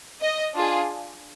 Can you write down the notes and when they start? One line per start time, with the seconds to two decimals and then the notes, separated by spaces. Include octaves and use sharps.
0.21 D#5
0.54 D4 F4 G#4